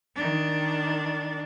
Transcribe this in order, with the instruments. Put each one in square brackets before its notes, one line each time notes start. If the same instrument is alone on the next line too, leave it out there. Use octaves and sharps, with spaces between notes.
[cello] D#3 D4